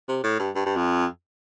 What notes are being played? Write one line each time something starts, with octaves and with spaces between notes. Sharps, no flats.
C3
A2
G2
G2
G2
F2